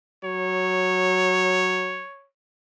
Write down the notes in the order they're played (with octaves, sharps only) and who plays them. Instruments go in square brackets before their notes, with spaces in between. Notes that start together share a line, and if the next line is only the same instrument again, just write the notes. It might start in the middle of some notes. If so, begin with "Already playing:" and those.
[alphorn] F#3 [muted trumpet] C#5